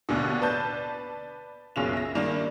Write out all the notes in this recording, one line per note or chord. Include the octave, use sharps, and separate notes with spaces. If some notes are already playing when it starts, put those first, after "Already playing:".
A1 D#2 B2 D3
B4 D5 A5 G6
F#1 B1 C#3 F4 F7
E5 A#6
G2 D#3 A#3 D4